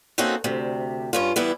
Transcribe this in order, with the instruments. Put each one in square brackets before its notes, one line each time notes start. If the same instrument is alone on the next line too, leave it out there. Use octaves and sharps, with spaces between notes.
[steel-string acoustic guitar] A#3 C4 C#4 D#4 F#4 A4
D2 C3
G2 C#4 F4
E3 G3 B3 E4